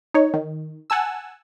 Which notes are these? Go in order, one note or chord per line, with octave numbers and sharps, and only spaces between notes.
D#4 C#5
D#3
F#5 G#5 A5 E6